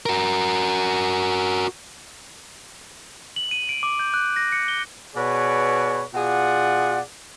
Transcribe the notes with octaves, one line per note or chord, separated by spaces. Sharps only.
F#4 A#4
F#7
D#7
D7
D6
G6
F#6
A#6
C#7
G7
B2 G#4 B4 C#5 D5
B2 F4 G#4 D5 F#5